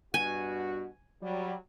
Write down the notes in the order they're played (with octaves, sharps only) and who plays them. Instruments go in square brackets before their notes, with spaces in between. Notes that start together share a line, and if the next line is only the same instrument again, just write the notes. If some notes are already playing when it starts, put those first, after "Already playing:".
[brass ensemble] G2 B2 F#4 [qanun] G#5
[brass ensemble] F#3 G3